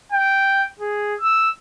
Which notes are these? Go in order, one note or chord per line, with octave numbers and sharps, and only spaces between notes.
G5
G#4
E6